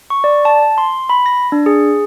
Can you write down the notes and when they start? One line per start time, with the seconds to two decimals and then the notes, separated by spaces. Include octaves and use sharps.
0.10 C#6
0.24 D5
0.45 A5
0.78 C6
1.09 B5
1.26 A#6
1.52 D4
1.66 G#4